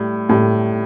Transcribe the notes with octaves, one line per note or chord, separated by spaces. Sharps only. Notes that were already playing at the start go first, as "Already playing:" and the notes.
Already playing: A2 G3
A2 G3